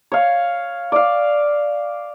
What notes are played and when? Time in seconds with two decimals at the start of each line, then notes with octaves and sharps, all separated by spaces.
0.12 C#5 F5
0.92 D5 F5